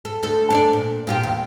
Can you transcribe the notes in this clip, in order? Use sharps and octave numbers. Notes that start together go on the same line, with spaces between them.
A4
D2 A4
D4 C#5 D5
A#2
A#2 F4 G4
E2